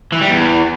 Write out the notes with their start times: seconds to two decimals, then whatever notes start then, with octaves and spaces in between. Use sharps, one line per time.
0.13 E3
0.22 G3
0.30 E2